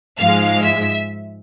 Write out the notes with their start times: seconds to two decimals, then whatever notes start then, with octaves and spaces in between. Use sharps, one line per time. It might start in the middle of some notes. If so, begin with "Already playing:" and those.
0.20 G#2 F3 G#3 F5
0.63 E5